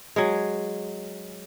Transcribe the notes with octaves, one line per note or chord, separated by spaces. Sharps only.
F#3 G#3